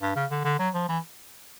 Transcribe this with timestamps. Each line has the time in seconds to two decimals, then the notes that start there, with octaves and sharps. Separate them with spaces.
0.02 G2
0.16 C#3
0.30 D3
0.45 D3
0.59 F#3
0.74 F3
0.88 E3